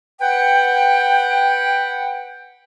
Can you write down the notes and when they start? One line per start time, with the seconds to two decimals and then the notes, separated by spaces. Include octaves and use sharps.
0.21 B4 F#5 G5